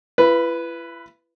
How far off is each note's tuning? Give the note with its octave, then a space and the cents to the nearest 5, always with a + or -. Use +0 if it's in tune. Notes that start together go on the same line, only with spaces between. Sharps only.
E4 +40 B4 +0